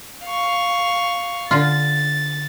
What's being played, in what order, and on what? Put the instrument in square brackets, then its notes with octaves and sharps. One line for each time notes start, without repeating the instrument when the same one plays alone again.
[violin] F5 C#6
[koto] D3 F4 [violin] A6